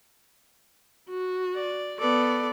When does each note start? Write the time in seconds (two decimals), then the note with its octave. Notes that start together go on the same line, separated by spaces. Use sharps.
1.09 F#4
1.55 D5
2.00 B3 A4 D5